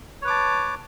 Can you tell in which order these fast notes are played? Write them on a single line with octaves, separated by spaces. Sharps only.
C#5 B4 D6 A5